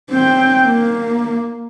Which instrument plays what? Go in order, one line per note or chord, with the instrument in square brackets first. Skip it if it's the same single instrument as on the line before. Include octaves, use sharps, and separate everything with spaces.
[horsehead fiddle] C4 G5
A#3